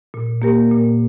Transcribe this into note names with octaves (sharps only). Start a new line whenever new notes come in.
A#2
A#3 G4 A#4
A#2